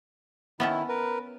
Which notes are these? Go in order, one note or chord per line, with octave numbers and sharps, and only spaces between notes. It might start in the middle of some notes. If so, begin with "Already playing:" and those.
D#3 B3 C#4 E4 A4
A#4 B4